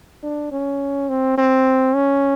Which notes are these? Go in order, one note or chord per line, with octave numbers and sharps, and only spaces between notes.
D4
C#4
C4
C4
C#4